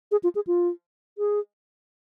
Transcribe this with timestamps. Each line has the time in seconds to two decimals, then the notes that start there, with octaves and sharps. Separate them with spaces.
0.12 G#4
0.24 F4
0.35 G#4
0.47 F4
1.18 G#4